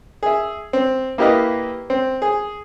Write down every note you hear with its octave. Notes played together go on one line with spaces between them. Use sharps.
G#4 E5
C4
A#3 E4 G4 B4 D#5 F5
C4
G#4